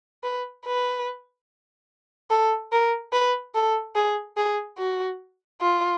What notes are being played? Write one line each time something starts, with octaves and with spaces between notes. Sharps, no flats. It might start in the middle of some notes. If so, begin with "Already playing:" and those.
B4
B4
A4
A#4
B4
A4
G#4
G#4
F#4
F4